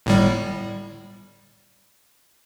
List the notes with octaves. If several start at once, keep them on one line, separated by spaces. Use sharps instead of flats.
G1 A2 G3